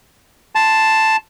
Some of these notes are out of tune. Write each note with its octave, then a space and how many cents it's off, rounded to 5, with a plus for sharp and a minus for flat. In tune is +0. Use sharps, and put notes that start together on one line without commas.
A5 +0 C6 +0